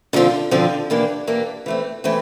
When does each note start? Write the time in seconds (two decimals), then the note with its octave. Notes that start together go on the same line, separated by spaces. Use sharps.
0.13 D3 F3 C4 F4
0.51 D3 F3 C4 F4
0.90 E3 A#3 D4 G4
1.27 E3 A#3 D4 G4
1.66 E3 A3 C4
2.04 E3 A3 C4